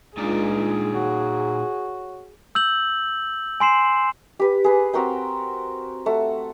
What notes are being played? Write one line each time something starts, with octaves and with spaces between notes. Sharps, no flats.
C#2 A#2 G#3 D4 D#4 F4 G#4 D5
F#4 C#5
E6 G6 F#7
G#5 C6 C7 E7
G4 B4
G#4 B4
C4 F#4 A#4 G5
A3 F#5